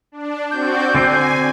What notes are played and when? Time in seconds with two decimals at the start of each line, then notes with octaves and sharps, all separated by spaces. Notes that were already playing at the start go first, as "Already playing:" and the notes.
0.12 D4
0.51 C4 F#4 D5 G6
0.95 D3 C4 C5 G#5